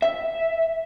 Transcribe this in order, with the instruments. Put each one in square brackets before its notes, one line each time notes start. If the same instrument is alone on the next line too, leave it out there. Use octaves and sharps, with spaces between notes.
[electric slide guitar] E5